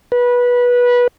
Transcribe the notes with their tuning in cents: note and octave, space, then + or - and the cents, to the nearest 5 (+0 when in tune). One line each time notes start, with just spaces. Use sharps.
B4 -20